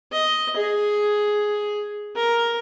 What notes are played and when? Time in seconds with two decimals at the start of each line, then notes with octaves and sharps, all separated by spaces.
0.12 D#5
0.56 G#4
2.16 A#4